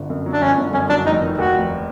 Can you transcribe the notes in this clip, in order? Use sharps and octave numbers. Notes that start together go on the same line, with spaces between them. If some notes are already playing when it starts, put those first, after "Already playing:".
Already playing: G1 D3
F#2
F#3
D4
G1 C#4
D3
F#2 C#4
F#3 D4
F1 D#4
D#3
D#2 F#4
F1